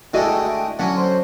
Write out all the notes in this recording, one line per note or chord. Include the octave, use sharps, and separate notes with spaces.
D3 G#3 A3 E4 F#4 D#5 G5
D3 F#3 C#4 F#5 G#5
C5 C6